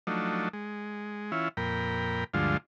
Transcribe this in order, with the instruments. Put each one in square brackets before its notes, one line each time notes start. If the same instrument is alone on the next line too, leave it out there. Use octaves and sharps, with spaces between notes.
[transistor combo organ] F3 F#3 A3 D4 D#4
G#3
E3 C#4 E4 F4
F2 A#2 A#4 G5 B5
D2 G2 D3 F3 G#3 F4